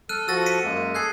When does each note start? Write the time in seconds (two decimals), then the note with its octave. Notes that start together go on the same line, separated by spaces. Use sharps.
0.09 A4 F6 F#6 D#7
0.28 F3 F#4 A4 E6 A6 A#6
0.46 B6 C#7 D#7
0.64 F#2 G#3 A#3
0.95 G#4 A4 F#6 G#6 C7